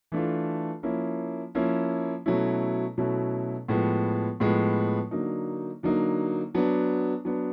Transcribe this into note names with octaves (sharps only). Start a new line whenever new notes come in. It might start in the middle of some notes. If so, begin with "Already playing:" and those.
E3 A3 D4 F4
F3 A#3 C#4 E4
F3 A#3 C#4 E4
B2 F#3 A3 C#4 E4
B2 F#3 A3 C#4 E4
A2 F3 G#3 B3
A2 F3 G#3 B3
D3 F#3 A#3 D#4
D3 F#3 A#3 D#4
F#3 B3 D4
F#3 B3 D4